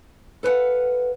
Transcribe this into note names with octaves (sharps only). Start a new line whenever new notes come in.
A4 B4 C5 F5 F#5